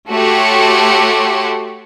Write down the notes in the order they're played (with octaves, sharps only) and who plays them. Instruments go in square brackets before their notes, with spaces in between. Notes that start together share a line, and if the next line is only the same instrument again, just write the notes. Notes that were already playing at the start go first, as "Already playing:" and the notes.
[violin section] A3 F#4 G4 C#5 C6